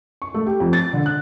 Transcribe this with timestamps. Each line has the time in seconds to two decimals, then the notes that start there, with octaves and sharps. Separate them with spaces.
0.22 C#6
0.34 A3
0.47 G4
0.60 F2
0.73 A6
0.93 D3
1.06 F#6